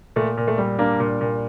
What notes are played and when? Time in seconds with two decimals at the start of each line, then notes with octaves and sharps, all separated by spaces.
0.16 A#2 A3
0.37 A#2
0.47 A3
0.58 G3
0.79 A#3 D4
1.00 A#2
1.21 A#2